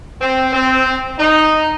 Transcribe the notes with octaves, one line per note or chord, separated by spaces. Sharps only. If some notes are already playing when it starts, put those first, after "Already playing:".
C4
C4
D#4